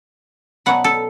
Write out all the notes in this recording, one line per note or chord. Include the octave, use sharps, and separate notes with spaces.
B2 F#3 B3 F#5
A4